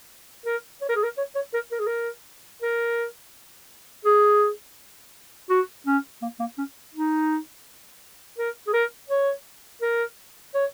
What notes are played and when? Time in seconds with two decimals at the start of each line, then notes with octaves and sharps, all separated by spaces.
0.46 A#4
0.82 C#5
0.89 A#4
0.96 G#4
1.04 A#4
1.18 C#5
1.36 C#5
1.54 A#4
1.72 A#4
1.79 G#4
1.87 A#4
2.62 A#4
4.06 G#4
5.50 F#4
5.87 C#4
6.22 A#3
6.40 A#3
6.58 C#4
6.95 D#4
8.39 A#4
8.67 G#4
8.74 A#4
9.10 C#5
9.82 A#4
10.55 C#5